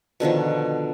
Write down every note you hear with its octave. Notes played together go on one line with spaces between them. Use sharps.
B2 D3 D#3 F3